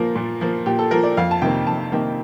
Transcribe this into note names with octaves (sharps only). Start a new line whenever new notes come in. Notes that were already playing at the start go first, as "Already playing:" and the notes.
Already playing: A#2 F3 A#3 A#4
A#2
F3 A#3
A#2 G4
A4
F3 A#3 A#4
D5
F2 F5
A5
C3 D#3 A#3 G5
F2 A5
C3 D#3 A#3 G5